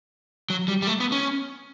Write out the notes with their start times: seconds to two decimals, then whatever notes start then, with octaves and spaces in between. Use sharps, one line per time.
0.50 F#3
0.68 G3
0.82 G3
0.87 A3
1.00 B3
1.12 C#4